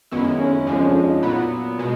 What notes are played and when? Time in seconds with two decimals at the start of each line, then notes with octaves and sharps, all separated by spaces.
0.11 F#2 D#3 G#3 B3 C#4 E4
0.39 C#4
0.67 F2 D3 F3 G#3 C#4
0.81 C#4
0.86 D4
1.04 D#4
1.23 A#2 F#3 B3 E4
1.79 B2 G#3